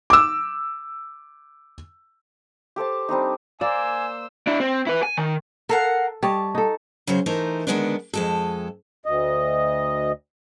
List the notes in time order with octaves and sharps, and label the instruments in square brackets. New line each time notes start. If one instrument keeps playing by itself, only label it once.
[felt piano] D6 E6
[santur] G4 A4 C5 A5
G3 C4 D4 D#4
[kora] A#3 D5 [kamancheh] C5 E6 [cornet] G#5
[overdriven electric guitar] D4 E4
C4
E4 B4
G#5
D#3
[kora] A4 [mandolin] A#4 F5 F#5
[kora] G3 C#5 D#5 [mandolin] A5
[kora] D#4 A4
[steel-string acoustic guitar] C#3 F#3 G#4 C5
E3 A3 D#4 A#4 C5
D3 D#3 G#3 B3 C4 D4
F2 G#3 A4
[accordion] D2 D#5